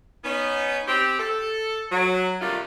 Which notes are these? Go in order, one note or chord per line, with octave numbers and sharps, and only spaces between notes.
B3 C#4 D#4
C4 G4
A4
F#3
C3 D#3 G3 A3 D4 F4